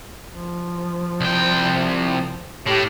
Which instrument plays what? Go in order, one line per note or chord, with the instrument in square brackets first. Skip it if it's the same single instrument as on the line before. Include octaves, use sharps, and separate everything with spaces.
[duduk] F3
[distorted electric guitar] C2 G5
[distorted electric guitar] A2 [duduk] G4